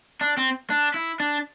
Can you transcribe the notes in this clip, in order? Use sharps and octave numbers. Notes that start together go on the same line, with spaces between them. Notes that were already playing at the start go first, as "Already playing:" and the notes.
D4
C4
D4
E4
D4